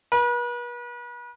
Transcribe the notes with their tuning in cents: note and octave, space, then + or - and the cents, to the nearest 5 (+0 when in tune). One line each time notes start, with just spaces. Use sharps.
B4 -40